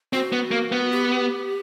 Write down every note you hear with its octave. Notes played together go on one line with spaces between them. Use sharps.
C4 F#4
B3
A#3
B3
G4